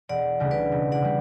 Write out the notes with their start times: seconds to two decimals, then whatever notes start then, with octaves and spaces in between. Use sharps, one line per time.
0.09 E1 D5 F#5
0.40 D2 C#3 G3
0.51 B4 D5
0.72 E1
0.92 D5 F#5
1.02 C#3 G3